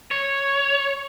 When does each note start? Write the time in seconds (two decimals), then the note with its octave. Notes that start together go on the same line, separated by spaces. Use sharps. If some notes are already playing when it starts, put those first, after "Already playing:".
0.11 C#5